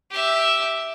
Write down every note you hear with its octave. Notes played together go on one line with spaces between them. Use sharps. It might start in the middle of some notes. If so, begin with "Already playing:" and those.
G4 E5